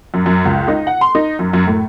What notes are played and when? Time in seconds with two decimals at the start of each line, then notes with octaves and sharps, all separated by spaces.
0.14 F#2
0.26 F#2
0.45 C#2
0.68 D#4
0.87 F#5
1.01 C6
1.15 D#4
1.39 F#2
1.53 F#2
1.67 A2